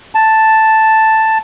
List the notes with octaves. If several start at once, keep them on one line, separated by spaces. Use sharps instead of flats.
A5